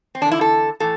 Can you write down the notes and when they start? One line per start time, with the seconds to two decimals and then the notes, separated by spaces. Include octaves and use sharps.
0.15 C4
0.21 E2 D4
0.26 D3
0.32 E4
0.41 A4
0.80 A2 E3 A4